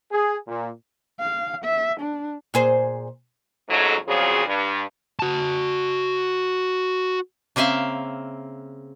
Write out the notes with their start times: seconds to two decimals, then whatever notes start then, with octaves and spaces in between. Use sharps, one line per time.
0.11 G#4
0.47 A#2
1.20 F5
1.64 E5
2.00 D4
2.54 A#2 G#4 C5
3.69 F2 G#2 C#3 F#3 A3
4.07 A#2 C#3 F3 F#3 C4 G#4
4.47 G2
5.19 F#4 A5
7.56 C#3 A#3 C4 E5 F5